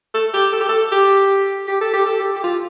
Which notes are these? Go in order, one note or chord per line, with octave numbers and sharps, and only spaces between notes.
A4
G4
A4
G4
A4
G4
G4
A4
G4
A4
G4
G4
F4